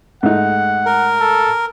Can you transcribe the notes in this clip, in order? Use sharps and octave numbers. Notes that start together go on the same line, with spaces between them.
G#2 A3 D#4 F#5
A#4
A4